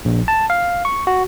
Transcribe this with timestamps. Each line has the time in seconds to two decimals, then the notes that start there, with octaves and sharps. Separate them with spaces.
0.05 A#1
0.28 A5
0.50 F5
0.85 C#6
1.07 F#4